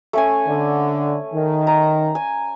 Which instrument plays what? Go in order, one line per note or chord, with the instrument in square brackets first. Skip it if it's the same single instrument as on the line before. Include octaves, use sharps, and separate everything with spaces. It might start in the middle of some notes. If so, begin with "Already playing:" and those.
[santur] A3 C#4 G#5
[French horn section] D3
D#3
[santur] A#5
G#5